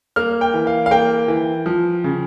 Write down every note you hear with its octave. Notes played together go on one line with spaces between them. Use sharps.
A#3 F6
G5
E3
F5
F5
A#3 G5
E3
F3
C#3